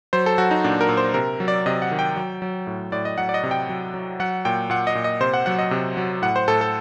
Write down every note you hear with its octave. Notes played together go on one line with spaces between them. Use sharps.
F#3 C5
A4
F#3 F#4
D#4
A#2 D4
A#4
A#2
C5
C3 A#4
F#3
D5
C3 D#5
F#5
D#3
G5
F#3
F#3
A2
A2 D5
D#5
F#3 F#5
D5
D#5
C3
G5
F#3
F#3
F#3 F#5
A#2 G5
A#2 F#5
D#5
A#2
D#5
C3 C5
F#5
F#3 F#5
D#5
C3
F#3
A2 F#5
C5
A2 A4
A4